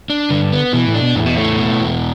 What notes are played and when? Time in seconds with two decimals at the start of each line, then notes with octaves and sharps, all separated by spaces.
0.10 D4
0.30 G2 D3
0.52 B3
0.73 B2 E3
0.87 A2
0.94 D4
1.01 B2
1.15 E2 A2
1.26 B2
1.35 A2 A3
1.59 B2
1.80 E2